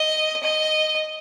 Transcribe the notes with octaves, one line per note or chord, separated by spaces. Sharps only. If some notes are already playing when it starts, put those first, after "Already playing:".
Already playing: D#5
D#5